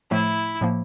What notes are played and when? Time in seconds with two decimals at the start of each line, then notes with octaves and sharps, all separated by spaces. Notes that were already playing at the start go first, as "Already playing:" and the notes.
0.11 A2 F3 A3 E4
0.61 A2 F3 A#3